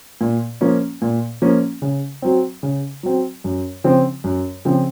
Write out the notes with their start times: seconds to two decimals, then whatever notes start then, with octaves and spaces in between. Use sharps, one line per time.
0.21 A#2
0.61 F3 A#3 C#4
1.02 A#2
1.42 F3 A#3 C#4
1.82 C#3
2.22 F#3 C4
2.63 C#3
3.03 F#3 C4
3.44 F#2
3.84 C#3 F3 C4
4.24 F#2
4.65 C#3 F3 C4